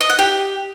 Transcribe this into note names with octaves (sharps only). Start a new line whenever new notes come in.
D#5
F#5
G4